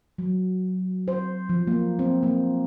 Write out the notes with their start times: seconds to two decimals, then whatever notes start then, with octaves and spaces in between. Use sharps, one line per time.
0.18 F#3
1.08 C5
1.49 F3
1.67 A#3
1.99 C4
2.23 A#3